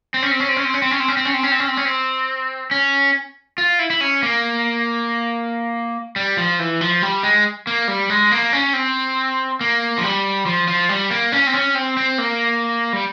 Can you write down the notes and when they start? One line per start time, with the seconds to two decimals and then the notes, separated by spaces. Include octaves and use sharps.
0.14 C4
0.22 C#4
0.31 C4
0.40 C#4
0.49 C4
0.56 C#4
0.65 C4
0.74 C#4
0.82 C4
0.91 C#4
1.00 C4
1.08 C#4
1.17 C4
1.25 C#4
1.34 C4
1.43 C#4
1.51 C4
1.60 C#4
1.68 C4
1.77 C#4
1.85 C4
2.71 C#4
3.58 F4
3.79 E4
3.90 E4
4.01 C#4
4.23 A#3
6.16 G3
6.37 F3
6.59 E3
6.81 F3
7.02 G3
7.23 G#3
7.67 A#3
7.88 G3
8.10 G#3
8.31 A#3
8.53 C#4
8.73 C4
9.61 A#3
9.98 F3
10.04 G3
10.46 F3
10.68 F3
10.89 G3
11.10 A#3
11.32 C#4
11.47 C4
11.54 C#4
11.75 C4
11.97 C4
12.18 A#3
12.93 G3